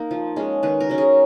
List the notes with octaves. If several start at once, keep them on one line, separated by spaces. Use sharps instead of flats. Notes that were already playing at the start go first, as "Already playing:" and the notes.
Already playing: A#3 D#4
F3
G#3 C#4
D#3 B4
A#4
F#3 C#4
G#4